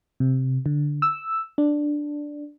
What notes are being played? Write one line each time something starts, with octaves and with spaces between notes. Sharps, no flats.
C3
D3
E6
D4